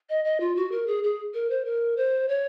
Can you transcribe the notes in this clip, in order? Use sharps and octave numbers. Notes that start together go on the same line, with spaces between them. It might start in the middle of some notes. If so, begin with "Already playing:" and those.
D#5
D#5
F4
F#4
A#4
G#4
G#4
A#4
C5
A#4
C5
C#5